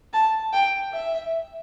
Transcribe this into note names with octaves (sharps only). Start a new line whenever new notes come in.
A5
G5
E5